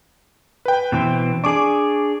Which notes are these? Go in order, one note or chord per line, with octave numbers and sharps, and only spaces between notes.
B4 G5
B2 E3 C4
D4 G#4 C#6 D6